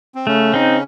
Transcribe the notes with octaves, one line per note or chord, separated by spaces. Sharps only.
C4
C#3 A3 C#4
C4 D#4